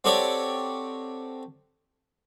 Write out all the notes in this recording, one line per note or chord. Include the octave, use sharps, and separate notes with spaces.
C4 F#4 G4 A4 C#5 D5